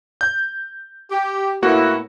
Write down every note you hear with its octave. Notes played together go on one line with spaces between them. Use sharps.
G6
G4
A2 A#3 B3 E4 F#4